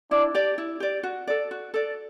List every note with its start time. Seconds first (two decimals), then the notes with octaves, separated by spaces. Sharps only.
0.10 D4 E4 D5
0.34 G4 D5
0.58 E4
0.80 G4 D5
1.03 F#4
1.27 A4 D5
1.51 F#4
1.74 A4 D5